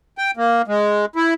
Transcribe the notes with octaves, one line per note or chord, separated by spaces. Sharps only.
G5
A#3
G#3
E4